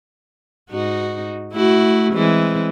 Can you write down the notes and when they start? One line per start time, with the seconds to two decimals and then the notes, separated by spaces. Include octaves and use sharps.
0.70 G#2 D#4 F#4
1.53 A3 E4 F#4
2.14 E3 G#3 C4